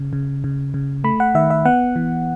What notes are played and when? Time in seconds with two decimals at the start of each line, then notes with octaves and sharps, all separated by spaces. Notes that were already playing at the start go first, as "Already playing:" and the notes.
Already playing: C#3
0.13 C#3
0.44 C#3
0.74 C#3
1.04 A3 B5
1.20 F#5
1.35 D#3 E5
1.50 E5
1.65 B3 F#5
1.96 E3